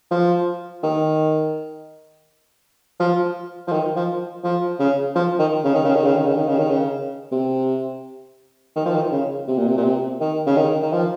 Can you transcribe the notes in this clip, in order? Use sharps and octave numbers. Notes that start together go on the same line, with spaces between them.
F3
D#3
F3
F3
D#3
F3
F3
C#3
F3
D#3
C#3
D#3
C#3
D#3
C#3
D#3
C#3
D#3
C#3
D#3
C#3
C3
D#3
F3
D#3
C#3
C3
A#2
C3
A#2
C3
D#3
C#3
D#3
D#3
F3